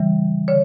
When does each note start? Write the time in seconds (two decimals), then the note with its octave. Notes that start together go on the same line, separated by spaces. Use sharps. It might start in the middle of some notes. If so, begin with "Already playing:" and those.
Already playing: C#3 E3 G3
0.48 D3 C#5